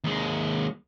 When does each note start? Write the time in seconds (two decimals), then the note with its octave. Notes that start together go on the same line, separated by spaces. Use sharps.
0.04 D#2 G#3